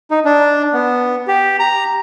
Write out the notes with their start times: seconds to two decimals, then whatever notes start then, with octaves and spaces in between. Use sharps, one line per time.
0.11 D#4
0.25 D4
0.73 B3
1.27 G4
1.60 A#5